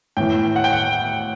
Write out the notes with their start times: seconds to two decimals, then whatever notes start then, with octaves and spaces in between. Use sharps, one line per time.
0.17 A2 E3 G5
0.56 F#5
0.64 G5
0.73 F#5